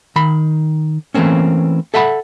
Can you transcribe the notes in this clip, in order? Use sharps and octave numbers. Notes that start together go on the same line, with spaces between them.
D#3 B5
E3 A3 A#3 C4 C#4
A4 E5 F#5 G#5 B5